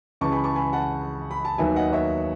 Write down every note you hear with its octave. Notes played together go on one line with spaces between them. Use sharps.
C#2 C#3 E3 A5 C#6
G#5 B5
A5 C#6
G#5 B5
F#5 A5
B5
A5
D#2 D#3 F#3 B3 D#4 E5 G#5
D#5 F#5
C#5 E5